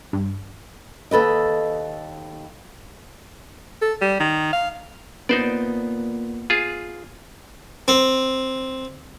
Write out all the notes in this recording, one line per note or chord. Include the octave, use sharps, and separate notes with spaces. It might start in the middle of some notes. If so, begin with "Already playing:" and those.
G2
D#2 A4 B4 D#5
A4
G3
D#3
F5
A#2 B3 D#4 C5 D5
F4 G#4
C4